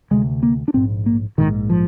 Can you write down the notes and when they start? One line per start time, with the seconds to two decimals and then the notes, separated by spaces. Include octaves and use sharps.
0.11 D2 C3 G#3
0.43 A#3
0.68 D4
0.74 A#1 G#2 C4
1.06 A#3
1.38 A#1 G#2 D#3
1.70 F3